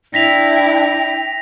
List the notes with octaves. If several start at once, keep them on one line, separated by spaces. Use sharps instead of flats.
D4 E4 G5 A#6 B6 F7